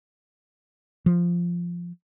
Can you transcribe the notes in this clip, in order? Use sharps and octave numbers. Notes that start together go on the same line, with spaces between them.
F3